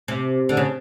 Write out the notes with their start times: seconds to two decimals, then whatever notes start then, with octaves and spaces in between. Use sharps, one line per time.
0.08 C3
0.49 D3
0.57 C#3